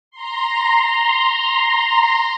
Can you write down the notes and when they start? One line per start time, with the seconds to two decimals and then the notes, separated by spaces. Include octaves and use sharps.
0.11 A#5 C6